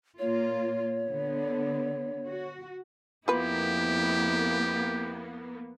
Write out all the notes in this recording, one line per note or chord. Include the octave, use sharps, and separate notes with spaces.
A#2 A#3 F4 C#5
D3 B3
F#4
F2 A#3 B3 E4 F4 G4 B4